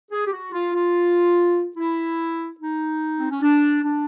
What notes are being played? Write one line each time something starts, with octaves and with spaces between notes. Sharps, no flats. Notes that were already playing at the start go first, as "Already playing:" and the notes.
G#4
G4
F#4
F4
F4
E4
D#4
C4
C#4
D4
D4